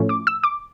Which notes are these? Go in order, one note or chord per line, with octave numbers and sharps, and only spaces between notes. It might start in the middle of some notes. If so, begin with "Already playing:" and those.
Already playing: A2 F3 A3 C#4
D6
E6
D6